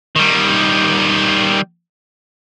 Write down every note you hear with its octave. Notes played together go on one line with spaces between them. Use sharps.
D#3 G3